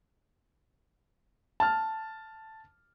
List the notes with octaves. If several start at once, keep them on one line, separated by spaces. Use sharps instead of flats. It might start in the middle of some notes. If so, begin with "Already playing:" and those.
A5 F6